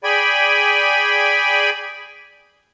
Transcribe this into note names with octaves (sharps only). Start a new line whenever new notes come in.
G#4 D5 G5 G#5 B5